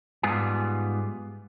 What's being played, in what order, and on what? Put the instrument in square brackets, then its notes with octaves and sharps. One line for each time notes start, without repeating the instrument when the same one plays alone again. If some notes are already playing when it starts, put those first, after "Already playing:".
[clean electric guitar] G#2 G3 B3 F4 G#4